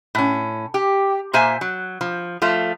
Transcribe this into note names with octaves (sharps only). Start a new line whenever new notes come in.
A2 C#4
G4
A#2 A#3 C5 E5 G#5
F#3
F3
F3 A3 F4